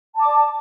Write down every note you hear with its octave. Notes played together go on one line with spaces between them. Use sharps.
D5 A5 D6